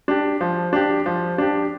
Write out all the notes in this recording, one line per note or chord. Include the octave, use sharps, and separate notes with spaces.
D4 G4
F3
D4 G4
F3
D4 G4